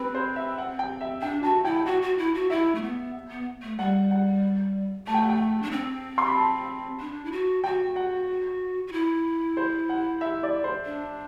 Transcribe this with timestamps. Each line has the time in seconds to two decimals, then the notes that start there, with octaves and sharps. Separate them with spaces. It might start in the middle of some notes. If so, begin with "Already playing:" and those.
Already playing: C4 B4
0.15 C5
0.36 E5
0.58 F#5
0.79 G5
1.01 E5
1.22 D4 G5
1.43 F#4 A5
1.65 E4 G5
1.76 G5
1.86 F#4 F#5
2.02 F#4
2.18 E4
2.34 F#4
2.50 E4 E5
2.75 A3
2.82 B3
3.31 B3
3.62 A3
3.79 G3 F#5
4.11 F#5
5.07 A3 A5
5.14 G5
5.22 F#5
5.29 G5
5.62 D4
5.72 C4
6.18 C6
6.27 B5
6.36 A5
7.00 D4
7.25 E4
7.32 F#4
7.64 F#4 G5
7.96 F#5
8.87 F#4
8.93 E4
9.57 C5
9.89 F#5
10.21 E5
10.43 D5
10.64 C5
10.86 D4